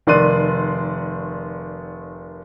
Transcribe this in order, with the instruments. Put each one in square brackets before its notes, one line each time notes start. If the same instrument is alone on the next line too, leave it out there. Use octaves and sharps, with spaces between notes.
[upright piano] F1 D#3 D5 C6 F#6 D#7